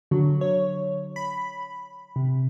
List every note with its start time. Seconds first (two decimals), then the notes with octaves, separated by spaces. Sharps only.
0.11 D3 F#3
0.41 C#5
1.16 B5
2.16 C3